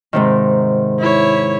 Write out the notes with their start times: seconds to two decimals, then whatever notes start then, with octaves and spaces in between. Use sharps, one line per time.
0.13 G#2 C3 D#3
1.00 E4 C#5